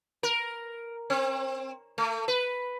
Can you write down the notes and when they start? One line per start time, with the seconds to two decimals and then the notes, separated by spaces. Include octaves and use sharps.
0.23 A#4
1.10 C4
1.98 A3
2.28 B4